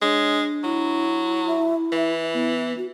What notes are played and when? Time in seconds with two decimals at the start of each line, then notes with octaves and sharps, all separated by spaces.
0.02 G#3 D4 C#5
0.64 F#3 E4
1.48 E5
1.92 E3 E5
2.34 B3
2.78 F#4